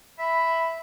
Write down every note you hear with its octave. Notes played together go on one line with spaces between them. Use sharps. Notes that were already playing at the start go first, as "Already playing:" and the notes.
E5 B5